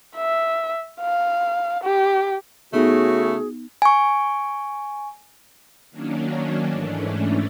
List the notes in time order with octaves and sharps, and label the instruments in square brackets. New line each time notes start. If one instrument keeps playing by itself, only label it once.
[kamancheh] E5
F5
G4
[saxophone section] C#3 A3 [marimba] B3 D#4 [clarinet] F#4 [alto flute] G#4
[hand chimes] G#5 C#6
[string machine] D#3 F#3 A#3 C#4 D4
G#2 E3 A3 C#4 D4